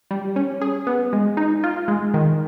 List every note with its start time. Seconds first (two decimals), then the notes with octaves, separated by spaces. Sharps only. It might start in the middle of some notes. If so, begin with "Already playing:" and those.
0.11 G3
0.36 C#4
0.61 G#4
0.87 B3
1.13 G#3
1.37 D#4
1.64 F4
1.88 G#3
2.14 D#3